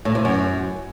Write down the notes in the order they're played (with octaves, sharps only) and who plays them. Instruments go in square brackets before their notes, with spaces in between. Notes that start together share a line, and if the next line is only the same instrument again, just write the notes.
[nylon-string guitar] A2
C3
F#2